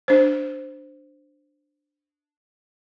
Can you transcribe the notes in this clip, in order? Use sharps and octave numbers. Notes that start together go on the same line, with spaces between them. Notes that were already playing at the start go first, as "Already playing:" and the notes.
D4 C5